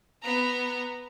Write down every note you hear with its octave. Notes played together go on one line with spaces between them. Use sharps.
B3 A#5